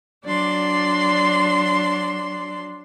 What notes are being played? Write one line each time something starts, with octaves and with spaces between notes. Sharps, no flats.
F#3 D4 D5 C6